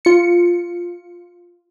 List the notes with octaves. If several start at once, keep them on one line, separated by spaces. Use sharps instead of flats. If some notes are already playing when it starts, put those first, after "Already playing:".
F4 C#7